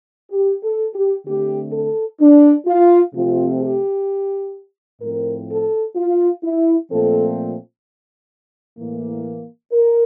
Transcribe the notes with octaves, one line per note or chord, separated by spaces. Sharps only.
G4
A4
G4
D3 A3 C4 G4
A4
D4
F4
C3 F3 A3 C4 F4
G4
A2 F3 C4 A#4
A4
F4
E4
A#2 F3 A3 C4 A4
A2 E3 A#3
A#4